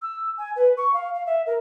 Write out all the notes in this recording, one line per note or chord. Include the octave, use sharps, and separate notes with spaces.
E6
G#5
B4
C#6
F5
F5
E5
A#4